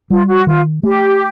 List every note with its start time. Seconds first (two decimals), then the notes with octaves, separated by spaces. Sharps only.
0.10 G3 F4
0.29 F#4
0.47 D#3 F4
0.83 A3 G4